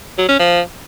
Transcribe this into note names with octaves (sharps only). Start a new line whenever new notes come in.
F#3
C#4
F3